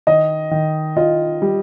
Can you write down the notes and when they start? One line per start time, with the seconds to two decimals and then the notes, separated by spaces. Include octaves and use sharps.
0.07 D#3 D#5
0.51 D#3
0.97 F4 D#5
1.42 G3